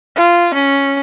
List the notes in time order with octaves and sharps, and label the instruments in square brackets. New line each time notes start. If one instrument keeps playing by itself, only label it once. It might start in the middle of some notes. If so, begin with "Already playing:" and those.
[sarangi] F4
C#4